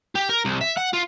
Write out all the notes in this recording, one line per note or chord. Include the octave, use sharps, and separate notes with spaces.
G4
A#4
C2
E5
F#5
F4